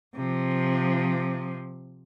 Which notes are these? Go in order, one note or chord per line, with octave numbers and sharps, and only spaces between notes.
C3 F3